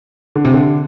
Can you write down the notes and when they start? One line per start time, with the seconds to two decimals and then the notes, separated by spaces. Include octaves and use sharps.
0.36 D3
0.45 C3
0.53 D3